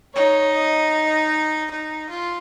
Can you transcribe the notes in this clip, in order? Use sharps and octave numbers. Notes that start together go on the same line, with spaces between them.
D#4 C#5
D#5
D#4
F4